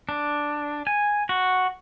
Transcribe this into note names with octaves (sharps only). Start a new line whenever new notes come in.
D4
G#5
F#4